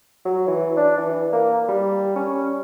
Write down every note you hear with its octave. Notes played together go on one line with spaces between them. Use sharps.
F#3
E3
D4
E3
A#3
G3
C#4